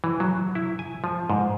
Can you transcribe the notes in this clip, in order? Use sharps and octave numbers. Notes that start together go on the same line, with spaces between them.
E3
F#3
E4
G#5
F3
G#2